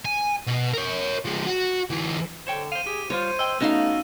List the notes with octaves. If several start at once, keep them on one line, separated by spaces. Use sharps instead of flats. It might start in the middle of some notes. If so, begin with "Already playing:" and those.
G#5
B2
A#4 C#5
F3 G#3
F#4
D2 E3
D3 C5 C#5 G5
C5 F5 D#7
G4 G#4
G3 D#4 F4 C5 C#5
D#5 G5 E6
A3 B3 C#4 D#4 F#4 D#5 F5